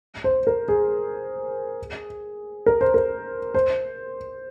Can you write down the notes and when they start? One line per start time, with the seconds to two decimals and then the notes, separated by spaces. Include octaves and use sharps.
0.24 C5
0.47 A#4
0.68 G#4
2.66 A#4
2.81 C5
2.94 A#4
3.54 C5